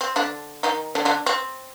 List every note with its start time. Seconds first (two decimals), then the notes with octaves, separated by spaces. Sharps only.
0.01 C4
0.16 D3 D4
0.63 D#3 D#4
0.95 D3 D4
1.05 D3 D4
1.26 C4